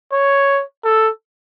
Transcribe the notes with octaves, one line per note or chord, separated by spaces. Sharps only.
C#5
A4